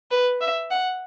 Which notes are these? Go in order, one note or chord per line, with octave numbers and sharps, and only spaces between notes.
B4
E5
F#5